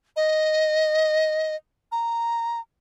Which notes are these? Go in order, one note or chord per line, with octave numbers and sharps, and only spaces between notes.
D#5
A#5